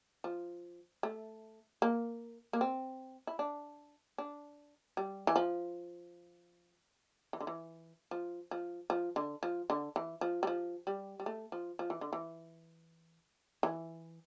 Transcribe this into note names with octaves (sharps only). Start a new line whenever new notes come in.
F3
A3
A#3
A#3
C4
E4
D4
D4
G3
E3
F3
E3
D3
E3
F3
F3
F3
D3
F3
D3
E3
F3
G3
F3
G3
G3
A3
F3
F3
E3
D3
E3
E3